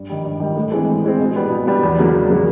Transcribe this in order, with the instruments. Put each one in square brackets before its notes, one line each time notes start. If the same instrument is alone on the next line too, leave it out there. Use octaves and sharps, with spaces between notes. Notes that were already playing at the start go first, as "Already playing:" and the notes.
Already playing: [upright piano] G2
D#3 G3
G2
D#3 G3
A2
E3 G#3 C4
A2
E3 G#3 C4
B2
G3 B3
B2
G3 B3
E2
C#3 F#3 A#3
E2
C#3 F#3 A#3